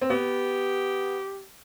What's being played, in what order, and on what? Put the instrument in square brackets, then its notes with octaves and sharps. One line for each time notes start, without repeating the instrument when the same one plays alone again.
[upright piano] C4
[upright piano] B3 [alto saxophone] G4